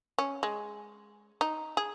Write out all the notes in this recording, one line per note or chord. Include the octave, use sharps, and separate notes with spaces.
C#4
G#3
D#4
G#4